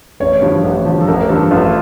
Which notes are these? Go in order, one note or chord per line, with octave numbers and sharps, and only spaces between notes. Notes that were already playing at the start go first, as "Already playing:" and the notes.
A1 C#5
G2 F3
A1
G2 F3
A4
A1 A#4
A#4
G2 F3 A4
A1 F4